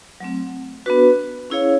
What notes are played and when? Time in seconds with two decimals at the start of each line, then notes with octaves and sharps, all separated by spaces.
0.20 F#3 A3 C4
0.86 B3 D4 F#4 B4
1.50 C#4 E4 G#4 C#5 F5